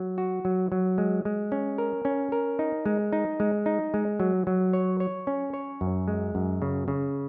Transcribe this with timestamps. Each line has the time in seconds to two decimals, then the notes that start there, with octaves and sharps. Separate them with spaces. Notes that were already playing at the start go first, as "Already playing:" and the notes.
Already playing: F#3
0.18 F#4
0.45 F#3
0.72 F#3
0.98 G#3
1.25 G#3
1.52 C#4
1.78 A#4
2.05 C#4
2.32 A#4
2.59 D#4
2.86 G#3
3.13 D#4
3.40 G#3
3.66 D#4
3.94 G#3
4.20 F#3
4.47 F#3
4.73 C#5
5.00 C#5
5.27 C#4
5.54 C#5
5.81 F#2
6.08 G#3
6.35 F#2
6.62 C#3
6.88 C#3